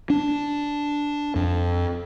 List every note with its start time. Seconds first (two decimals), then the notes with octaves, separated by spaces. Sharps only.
0.10 D4
1.36 F2